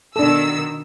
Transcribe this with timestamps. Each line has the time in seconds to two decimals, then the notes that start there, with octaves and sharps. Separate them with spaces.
0.16 B2 D#3 D4 A4 E6